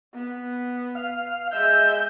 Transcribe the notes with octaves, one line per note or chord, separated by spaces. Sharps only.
B3
F5
G#3 E5 G6